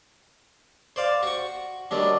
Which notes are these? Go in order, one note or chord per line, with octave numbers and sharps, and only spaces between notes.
C5 D5 F5
F#4 C#6
D#3 F#3 G3 D4